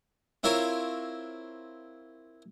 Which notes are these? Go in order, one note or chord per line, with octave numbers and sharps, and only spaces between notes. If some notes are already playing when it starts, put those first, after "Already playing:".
C4 E4 F4 A#4 C#5